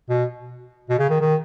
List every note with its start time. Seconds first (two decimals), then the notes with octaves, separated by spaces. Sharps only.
0.10 B2
0.90 B2
0.99 C#3
1.10 D#3
1.21 D#3